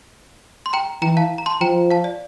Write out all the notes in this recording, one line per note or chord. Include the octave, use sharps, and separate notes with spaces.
C6
G5 A#5
E3 G5 A#5
F5 A5
A#5
A5 C6
F3 G5 A#5
F5 A5
D5